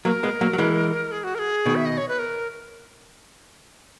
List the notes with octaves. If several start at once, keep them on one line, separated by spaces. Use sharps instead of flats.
F#3 A#3 B4
A#4
G#3 B3
F#3 A#3
F#3
E3 G#3
G#4
F#4
A#4
G#4
B2 D#3
E5
D#5
C#5
B4
A#4